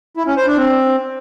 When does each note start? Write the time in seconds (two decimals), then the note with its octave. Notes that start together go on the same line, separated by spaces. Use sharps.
0.17 E4
0.27 C#4
0.37 C5
0.47 D4
0.57 C4